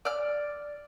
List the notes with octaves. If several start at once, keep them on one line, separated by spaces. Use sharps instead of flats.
D5 F6